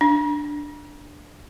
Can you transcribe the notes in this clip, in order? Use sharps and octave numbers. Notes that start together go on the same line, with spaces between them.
D4